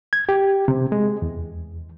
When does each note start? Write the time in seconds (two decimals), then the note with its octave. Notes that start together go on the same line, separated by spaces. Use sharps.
0.13 G#6
0.29 G4
0.68 C3
0.92 G#3
1.22 E2